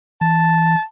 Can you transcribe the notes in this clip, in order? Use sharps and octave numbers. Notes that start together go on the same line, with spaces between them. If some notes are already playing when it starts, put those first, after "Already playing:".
E3 A5